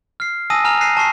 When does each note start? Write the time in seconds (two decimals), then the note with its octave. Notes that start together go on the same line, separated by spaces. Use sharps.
0.20 F6 C7
0.50 G#5 A5 D#6 E6 A#6 D#7
0.64 G#5 A#5 F6 F7
0.81 F#6 A#6 C7 D#7
0.97 A5 C#6 C7